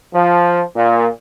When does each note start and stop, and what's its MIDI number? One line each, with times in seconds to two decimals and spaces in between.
0.14 0.61 53
0.75 1.07 46